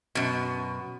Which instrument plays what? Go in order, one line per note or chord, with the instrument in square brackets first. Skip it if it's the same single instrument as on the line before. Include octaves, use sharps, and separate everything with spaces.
[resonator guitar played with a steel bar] F#2 B2